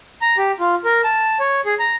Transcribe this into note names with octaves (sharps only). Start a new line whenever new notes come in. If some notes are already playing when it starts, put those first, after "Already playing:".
A#5
G4
F4
A#4
A5
C#5
G#4
A#5